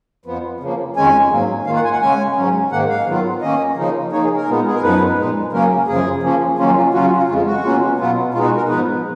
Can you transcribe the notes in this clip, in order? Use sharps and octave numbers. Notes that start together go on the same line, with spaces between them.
F2 F3 B3
C#3 F3 A#3
F2 D#3 G#3 C#4 G#5
G#2 F#3 A#3
D#3 A#3 F4 F5
F#5
G#5
F#5
C#3 G#3 C#4 G#5
G#2 F#3 C#4
G#2 D#3 A#3 F#5
F5
D#3 F#3 B3 F4
D#3 A#3 C#4 D#5
C#3 F3 A#3 D#4
D#3 A#3 D#4 C#5
G#4
A#4
A#2 G#3 B3 D#4
G#4
A#4
F#2 F3 B3 D#4 B4
A#2 G#3 D#4
C#3 F#3 A#3 C#4 A#4
F#2 C#3 F3 G#4
C#3 F3 A#3 C#4
D#3 F#3 A#3 C#4 F4
F4
C#3 F#3 C#4 F4 F#4
F#4
F4
F2 C#3 G#3 F4
F#4
B2 A#3 C#4 F4
B2 F#3 B3 F4
B2 G#3 D#4 F4
F#4
A#4
G#2 F3 B3 D#4 B4